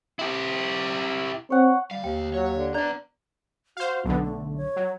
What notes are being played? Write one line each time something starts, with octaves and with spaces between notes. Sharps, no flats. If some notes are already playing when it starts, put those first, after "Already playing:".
E4 G4
C4 C#5 F#5
D2 G3 F5
D#2 G5
F#3 C#5
D3
B3 D4 C5 D5 A#5
F#4 C5 F5
B1 D3 B3
A3
C#5
F#3